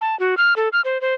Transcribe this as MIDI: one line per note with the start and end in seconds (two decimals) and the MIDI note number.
0.01 0.18 81
0.20 0.35 66
0.37 0.54 89
0.56 0.69 69
0.73 0.81 89
0.85 1.00 72
1.01 1.14 72